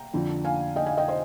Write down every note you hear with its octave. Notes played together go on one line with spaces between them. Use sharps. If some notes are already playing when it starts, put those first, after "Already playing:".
Already playing: G5 A#5
F2 D3 F3
F5 G#5
D#5 G5
F5 G#5
D#5 G5
C5 D#5